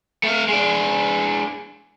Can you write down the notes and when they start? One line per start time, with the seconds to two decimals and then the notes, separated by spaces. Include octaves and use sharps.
0.23 A3 F5
0.48 G#3 D4